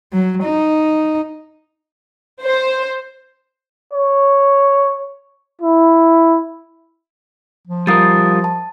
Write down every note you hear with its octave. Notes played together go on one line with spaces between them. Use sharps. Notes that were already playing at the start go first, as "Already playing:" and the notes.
F#3
D#4
C5
C#5
E4
F3
G3 F4 A#4 D#6 A6
A5